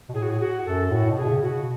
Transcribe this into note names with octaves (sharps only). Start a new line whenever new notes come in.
B2
A2 G#4
F#4
G#4
F#4
F#2 A4
A2 F#4
B2
G#4
B2
C#3
F#4
B2